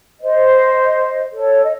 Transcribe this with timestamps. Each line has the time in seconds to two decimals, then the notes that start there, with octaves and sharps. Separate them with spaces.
0.21 C5 D#5
1.32 A4 C#5
1.64 D#5